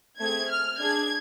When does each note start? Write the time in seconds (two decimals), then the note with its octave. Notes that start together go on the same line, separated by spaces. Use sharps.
0.19 A3 C4 G#4 G#6
0.50 F6
0.79 D4 G#4 G#6